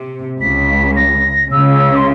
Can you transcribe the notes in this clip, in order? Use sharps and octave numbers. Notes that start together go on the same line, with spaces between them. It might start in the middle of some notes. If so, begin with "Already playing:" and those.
Already playing: C3
C#2 C#3 B6
A#6
C#2 C#3 E6
C6